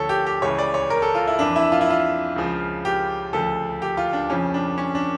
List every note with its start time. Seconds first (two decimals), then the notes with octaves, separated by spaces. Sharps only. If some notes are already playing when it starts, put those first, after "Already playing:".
Already playing: D2 D3 F3 A4 C#5
0.09 G4
0.26 G4
0.42 C#2 C#3 E3 C#5
0.58 D5
0.74 C#5
0.90 A#4
1.02 A4
1.15 F4
1.27 E4
1.39 F2 E3 D4
1.56 E4
1.72 F4
1.81 E4
1.90 F4
2.36 C#2 C#3 F3
2.85 G4
3.33 D2 C#3 F3 A4
3.82 G4
3.97 F4
4.13 D4
4.30 F2 C#3 F3 C#4
4.54 D4
4.78 C#4
4.95 D4